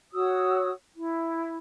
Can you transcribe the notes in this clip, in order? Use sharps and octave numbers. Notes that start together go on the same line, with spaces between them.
F#4 C#5 D#6 E6
E4